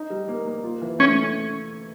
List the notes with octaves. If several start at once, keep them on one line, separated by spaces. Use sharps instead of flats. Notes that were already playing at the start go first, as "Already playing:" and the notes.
Already playing: D#4
G3
A#3
A#3
F4
E3
A3 C#4